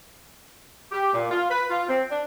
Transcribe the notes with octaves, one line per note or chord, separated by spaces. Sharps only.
G4
A#2
F4
B4
F4
C4
D4